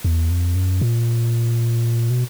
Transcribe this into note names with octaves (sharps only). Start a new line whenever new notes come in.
E2
F2
F#2
A#2
B2